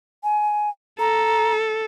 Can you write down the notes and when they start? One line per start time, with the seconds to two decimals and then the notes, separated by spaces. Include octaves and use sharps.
0.24 G#5
0.99 A4 A#5